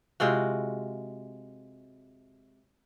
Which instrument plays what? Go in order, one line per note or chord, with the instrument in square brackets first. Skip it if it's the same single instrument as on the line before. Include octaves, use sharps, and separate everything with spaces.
[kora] C3 G#3 F4 F#4